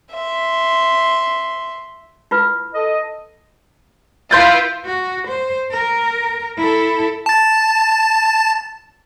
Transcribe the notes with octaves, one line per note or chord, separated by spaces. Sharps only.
E5 C6
E4 F4 B4
A4 D#5
E4 F4 B4 C6 G6 A6
F#4
C5
A#4
E4 A4
A5 A6